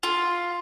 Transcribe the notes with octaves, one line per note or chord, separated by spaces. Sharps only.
F4